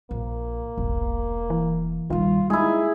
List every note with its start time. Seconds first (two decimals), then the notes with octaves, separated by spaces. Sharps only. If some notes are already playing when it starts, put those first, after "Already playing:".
0.11 A#1 A#3
0.78 E1 A#1
1.50 E3
2.10 A#1 D#3 G3 F4
2.50 G#3 A#3 D#4 E4 G#4